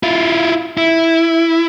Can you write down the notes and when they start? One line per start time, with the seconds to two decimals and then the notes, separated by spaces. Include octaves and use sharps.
0.03 E4 F4
0.78 E4